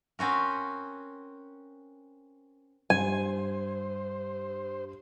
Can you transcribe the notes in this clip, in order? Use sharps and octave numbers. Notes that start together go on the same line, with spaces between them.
C4 C#4 F#4 A#4
G2 C5 G#5